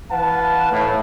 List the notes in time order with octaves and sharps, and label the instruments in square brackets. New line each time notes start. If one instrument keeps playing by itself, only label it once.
[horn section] E3 B4 F5 F#5 A5
A2